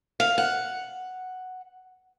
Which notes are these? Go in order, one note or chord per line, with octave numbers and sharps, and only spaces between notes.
F5
F#5